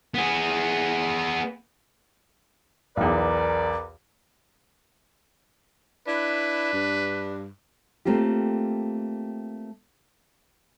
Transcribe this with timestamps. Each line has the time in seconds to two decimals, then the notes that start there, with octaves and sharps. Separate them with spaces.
0.14 B3 G#4
2.97 B1 E2 A#4 B4 D5
6.08 D4 E4 B4
6.73 G2
8.05 A3 A#3 C4 F4 G4